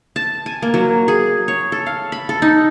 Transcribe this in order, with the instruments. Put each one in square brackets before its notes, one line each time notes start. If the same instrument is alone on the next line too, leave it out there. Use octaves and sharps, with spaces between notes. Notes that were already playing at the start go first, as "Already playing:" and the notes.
[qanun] A5
G#5
A#3
F#3
G#4
C#5
A4
F5
B5
A4
D#4